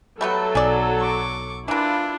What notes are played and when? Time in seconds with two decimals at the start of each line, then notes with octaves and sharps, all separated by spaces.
0.21 F#3 G3 A3 B3 A4
0.55 B1 G#4 D5
1.00 C#6 D6
1.68 E3 A#3 D4 E4 F4